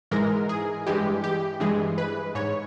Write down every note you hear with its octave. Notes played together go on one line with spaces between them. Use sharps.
G#2 E3 G#3 A#4
G#4
G2 E3 G#3 G4
G4
G2 E3 G#3 G#4
B4
G#2 C#5